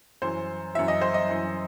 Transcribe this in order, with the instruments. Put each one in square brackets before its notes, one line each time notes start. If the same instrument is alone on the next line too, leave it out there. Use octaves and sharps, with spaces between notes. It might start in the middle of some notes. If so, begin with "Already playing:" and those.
[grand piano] F#2 E3 C5
F#2 E3 E5
D#5
C5
D#5
F#2 E3